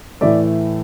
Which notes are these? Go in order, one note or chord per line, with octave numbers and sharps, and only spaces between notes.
A2 E3 A3 D5 E5